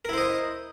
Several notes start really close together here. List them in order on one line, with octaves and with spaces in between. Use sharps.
A#4 E4 C5 D#5